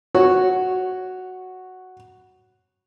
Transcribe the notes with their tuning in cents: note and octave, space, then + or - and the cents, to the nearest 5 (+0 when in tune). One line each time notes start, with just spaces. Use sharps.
F#4 +0 C#5 -5